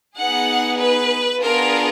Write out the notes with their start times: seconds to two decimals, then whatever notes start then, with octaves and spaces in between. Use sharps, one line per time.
0.17 B3 D#4 G#4 F#5
0.79 B4
1.42 B3 D4 F4 G#4 A#4